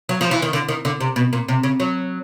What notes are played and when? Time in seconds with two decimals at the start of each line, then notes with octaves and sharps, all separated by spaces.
0.09 F#3
0.21 F3
0.31 E3
0.42 D#3
0.53 D3
0.68 D#3
0.85 D3
1.00 C3
1.16 B2
1.33 A#2
1.48 C3
1.63 C#3
1.80 F#3